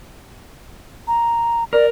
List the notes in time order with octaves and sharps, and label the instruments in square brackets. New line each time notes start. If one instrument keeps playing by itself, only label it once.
[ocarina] A#5
[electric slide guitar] A#4 [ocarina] D5